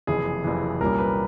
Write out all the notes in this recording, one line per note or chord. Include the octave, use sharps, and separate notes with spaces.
F#1 F2 C3 E3 G#4
F#1 F2 C3 E3
C2 A#2 G3 A#3 C#4 A#4
B4